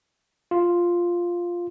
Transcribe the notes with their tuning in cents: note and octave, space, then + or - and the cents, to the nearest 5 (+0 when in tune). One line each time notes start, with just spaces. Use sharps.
F4 +0